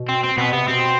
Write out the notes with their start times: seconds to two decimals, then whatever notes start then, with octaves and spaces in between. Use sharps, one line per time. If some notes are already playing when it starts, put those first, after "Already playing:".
Already playing: B2
0.09 C4
0.23 C4
0.37 B2 B3
0.53 C3 B3
0.68 B2 C4